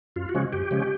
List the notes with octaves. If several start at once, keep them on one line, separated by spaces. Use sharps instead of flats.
F#2 F4
F#4
C#3 F3 G#3 C#4
F#2 G4
C#3 F3 G#3 C#4